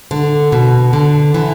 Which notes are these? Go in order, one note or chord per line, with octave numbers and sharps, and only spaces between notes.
D3
B2
D3
E3